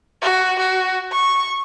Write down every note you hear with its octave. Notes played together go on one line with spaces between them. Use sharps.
F#4
F#4
C#6